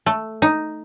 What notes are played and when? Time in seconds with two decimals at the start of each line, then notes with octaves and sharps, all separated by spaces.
0.06 A3
0.42 D#4